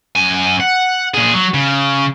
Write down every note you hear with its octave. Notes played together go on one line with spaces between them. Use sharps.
F#2 G#5
F#5
A#2 G#4
F#3
C#3